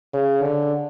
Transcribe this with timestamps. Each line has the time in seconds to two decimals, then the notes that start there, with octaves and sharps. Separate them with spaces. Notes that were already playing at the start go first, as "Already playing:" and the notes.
0.14 C#3
0.42 D3